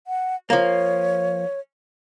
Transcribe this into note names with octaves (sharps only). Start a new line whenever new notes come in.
F#5
F3 A#3 C#5